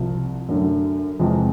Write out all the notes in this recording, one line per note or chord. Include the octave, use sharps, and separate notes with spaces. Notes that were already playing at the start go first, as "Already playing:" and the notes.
Already playing: C2 C3 F3
F#2 D3 F#3 A3
E2 C3 F3 G#3 C4